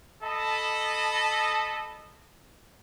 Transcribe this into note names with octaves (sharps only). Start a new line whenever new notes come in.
A4 D#5 A5 B5